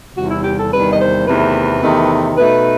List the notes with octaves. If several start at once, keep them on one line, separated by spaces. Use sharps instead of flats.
E2 C3 D#3 G3 F#4
E4
G4
A4
E2 C3 D#3 G3 B4
D#5
C5
E2 C3 D#3 A3 B4
E2 C3 D#3 A3
B2 A3 D#4 B4